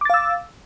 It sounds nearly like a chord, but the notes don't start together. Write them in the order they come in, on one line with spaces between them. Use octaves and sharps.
D6 A6 F5 E6